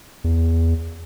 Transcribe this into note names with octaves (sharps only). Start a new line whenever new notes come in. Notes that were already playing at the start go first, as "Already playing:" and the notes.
E2